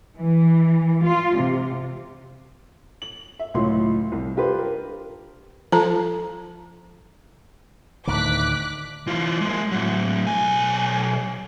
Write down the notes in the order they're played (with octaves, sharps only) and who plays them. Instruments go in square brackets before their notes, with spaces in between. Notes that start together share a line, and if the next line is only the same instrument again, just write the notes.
[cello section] E3
F4
C3
[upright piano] F#7
E5
C#2 A2 F#3 F4 C#5 C6
C2
D4 F4 G4 B4 C5
A#4
[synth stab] F3 [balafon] A4 A5 A#5
[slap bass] D2 A2 D#3 [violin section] D6 F#6 B6
[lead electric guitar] E3 F4
G#3 A#3
A2 F#3
B1 G#5